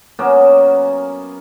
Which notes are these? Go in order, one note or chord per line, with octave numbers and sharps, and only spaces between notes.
F#3 A#3 B3 C#4